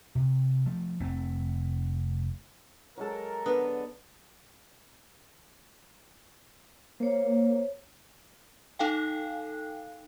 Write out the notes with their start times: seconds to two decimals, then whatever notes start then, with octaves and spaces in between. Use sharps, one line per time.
0.15 C3
0.66 F3 A3
1.00 F1 A3 C4
2.97 F#3 G#3 A4 A#4
3.46 D3 B3 B4
7.00 A#3 C5 C#5
8.79 D#4 A4 F5 G5